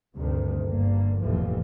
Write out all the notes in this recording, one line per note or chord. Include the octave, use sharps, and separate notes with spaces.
D2 G2 C3 D#3
G1 G2 A#3
F1 A#1 D#2 A2 E3 F3